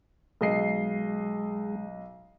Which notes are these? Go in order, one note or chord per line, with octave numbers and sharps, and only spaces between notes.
B1 G#3 D#5 C7